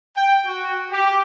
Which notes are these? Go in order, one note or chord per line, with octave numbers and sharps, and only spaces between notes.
G5
F#4
G4